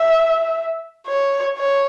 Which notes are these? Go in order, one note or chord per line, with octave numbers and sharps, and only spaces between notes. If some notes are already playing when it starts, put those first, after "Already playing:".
Already playing: E5
C#5
C#5